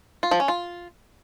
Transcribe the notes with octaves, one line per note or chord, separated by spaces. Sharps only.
F4
F3
C#4
F4